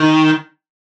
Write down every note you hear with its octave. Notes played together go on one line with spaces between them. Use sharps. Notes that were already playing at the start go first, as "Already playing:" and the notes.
Already playing: D#3